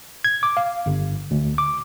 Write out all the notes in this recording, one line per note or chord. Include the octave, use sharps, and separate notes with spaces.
G#6
D6
F5
G1
D2
D6